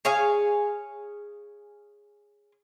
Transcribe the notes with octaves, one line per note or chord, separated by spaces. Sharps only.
G#4 C#5 F5 G#5